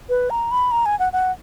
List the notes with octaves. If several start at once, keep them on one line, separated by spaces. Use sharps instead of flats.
B4
A#5
B5
A#5
G#5
F#5
F#5